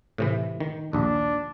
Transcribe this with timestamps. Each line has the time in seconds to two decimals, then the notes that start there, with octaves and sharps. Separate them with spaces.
0.18 A2 C3 E3
0.60 D#3
0.93 A#1 D#2 D4